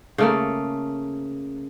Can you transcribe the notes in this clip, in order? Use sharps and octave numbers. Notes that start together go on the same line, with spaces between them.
C#3 A3 A#3